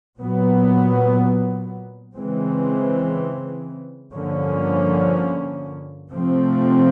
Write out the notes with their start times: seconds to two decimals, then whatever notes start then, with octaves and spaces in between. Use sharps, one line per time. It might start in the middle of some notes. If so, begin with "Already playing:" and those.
0.18 A#2 F#3 B3
2.15 C#3 E3 G#3 C4
4.13 G2 D3 F3 A#3 C#4
6.11 C3 F3 A3 C4